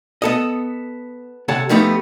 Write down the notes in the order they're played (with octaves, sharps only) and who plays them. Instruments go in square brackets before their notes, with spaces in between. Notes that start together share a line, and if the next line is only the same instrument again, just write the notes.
[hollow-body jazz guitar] B3 A4 D#5
C3 A4 C#5 F#5 A5
F3 A3 B3 D#4 G4